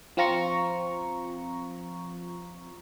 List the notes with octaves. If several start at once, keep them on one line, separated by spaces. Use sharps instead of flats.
F3 C4 F4 A#5 C#6